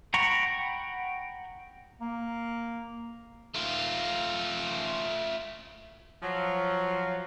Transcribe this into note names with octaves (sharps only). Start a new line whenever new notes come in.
F#5 G5 A#5 B5 C#6
A#3
A3 F4
F3 F#3